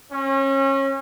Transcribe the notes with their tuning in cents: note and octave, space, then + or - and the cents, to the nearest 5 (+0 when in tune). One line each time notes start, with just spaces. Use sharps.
C#4 -30